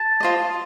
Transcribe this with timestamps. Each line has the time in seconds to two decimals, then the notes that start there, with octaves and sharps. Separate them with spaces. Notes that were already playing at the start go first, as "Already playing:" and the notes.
Already playing: A5
0.20 F4 C5 D#5